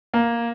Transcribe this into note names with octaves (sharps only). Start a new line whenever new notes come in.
A#3